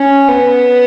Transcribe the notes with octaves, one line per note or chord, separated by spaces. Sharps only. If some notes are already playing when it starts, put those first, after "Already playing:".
Already playing: C#4
B3